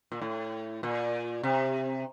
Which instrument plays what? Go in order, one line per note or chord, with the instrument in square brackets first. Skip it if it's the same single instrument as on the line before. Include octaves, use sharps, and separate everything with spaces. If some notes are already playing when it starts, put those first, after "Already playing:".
[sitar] A#2
A2
A#2
C3